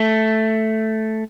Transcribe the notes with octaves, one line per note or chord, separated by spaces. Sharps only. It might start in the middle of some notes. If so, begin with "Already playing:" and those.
Already playing: A3